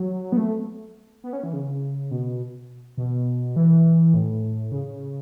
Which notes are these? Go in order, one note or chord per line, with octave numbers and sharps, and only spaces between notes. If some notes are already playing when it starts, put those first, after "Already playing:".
Already playing: F#3
B3
A3
B3
C#4
E3
C#3
B2
B2
E3
A2
C#3